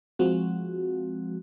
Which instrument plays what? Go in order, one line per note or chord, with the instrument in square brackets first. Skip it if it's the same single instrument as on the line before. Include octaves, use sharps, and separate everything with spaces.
[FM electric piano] F3 G#3 C4 F#4